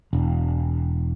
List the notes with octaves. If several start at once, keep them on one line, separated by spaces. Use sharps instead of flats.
E1